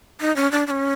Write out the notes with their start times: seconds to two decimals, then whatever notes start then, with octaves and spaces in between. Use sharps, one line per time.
0.21 D#4
0.36 C#4
0.52 D4
0.67 D4
0.71 C#4